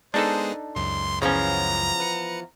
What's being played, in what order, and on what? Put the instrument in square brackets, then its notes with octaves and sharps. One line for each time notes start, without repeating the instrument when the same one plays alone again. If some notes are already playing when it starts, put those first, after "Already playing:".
[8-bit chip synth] G#3 B3 G#4 [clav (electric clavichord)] D4 D#4 A4 [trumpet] C5
[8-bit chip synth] C#2 F#2 [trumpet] C6
[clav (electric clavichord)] C#3 C#4 [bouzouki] E3 F3 B3 [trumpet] A#5
[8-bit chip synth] B4 C#7